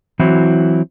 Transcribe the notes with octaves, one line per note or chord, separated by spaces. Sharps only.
E3 F#3 C4 E4 F#4